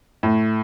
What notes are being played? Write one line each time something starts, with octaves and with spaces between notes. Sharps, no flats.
A2